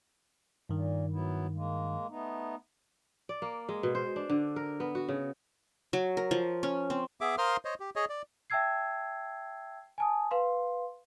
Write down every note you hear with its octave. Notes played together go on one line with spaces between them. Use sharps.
G2 A#2 D#3
F#3 B3 E4
G#3 A#3
A3 B3 D#4
D5
A#3
G#3
B2
C5
D4
D3
A#4
B3
F#4
C#3
F#3
A#4
F3
C#4
C4
B3 G#4 E5 D6
A#4 C5 F5 C6 D#6 F6
C5 C#5 D#5
G4
G#4 C#5 D#5
D5
E5 G5 A5 E6 G#6 C7
G#5 A5 D#6
B4 F5 C6